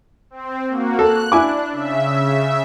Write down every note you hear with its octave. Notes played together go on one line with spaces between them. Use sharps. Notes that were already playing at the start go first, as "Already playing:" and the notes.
C4
A#3 F#4
A4 F#6
D4 E4 G#5 D6
C#3 E5